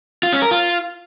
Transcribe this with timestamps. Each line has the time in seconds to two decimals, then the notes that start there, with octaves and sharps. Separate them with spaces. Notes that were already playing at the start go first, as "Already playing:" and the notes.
0.23 F4
0.33 C#4
0.42 A#4
0.51 F4